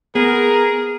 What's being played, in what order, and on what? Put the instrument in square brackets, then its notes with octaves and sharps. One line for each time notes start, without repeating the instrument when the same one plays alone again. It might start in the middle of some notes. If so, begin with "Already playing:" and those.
[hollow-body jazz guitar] B3 [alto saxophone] G#4 [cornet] A#4